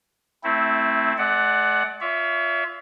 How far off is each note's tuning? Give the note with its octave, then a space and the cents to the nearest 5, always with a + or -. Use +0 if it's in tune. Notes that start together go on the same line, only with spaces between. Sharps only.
A3 +5 C4 +5 E4 -20
A3 -45 D5 +10 F#5 +10
F4 +0 C#5 +40 E5 +0